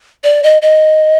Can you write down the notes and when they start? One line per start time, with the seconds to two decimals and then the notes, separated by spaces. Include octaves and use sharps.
0.24 D5
0.44 D#5
0.62 D#5